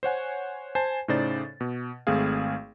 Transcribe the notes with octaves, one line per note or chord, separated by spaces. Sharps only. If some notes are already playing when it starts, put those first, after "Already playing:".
C5 C#5 F#5 G#5
C5 G#5 A5
A2 C#3 D#4 C5 D5 A6
B2
G#1 A3 C4 G#4 F5